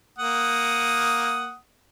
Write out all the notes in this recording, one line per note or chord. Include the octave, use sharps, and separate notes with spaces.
A#3 F#5 D#6